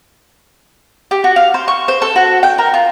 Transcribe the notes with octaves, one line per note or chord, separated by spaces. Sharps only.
G4
F#4
F5
C5
C#6
C5
A4
F#4
G5
A#4
F4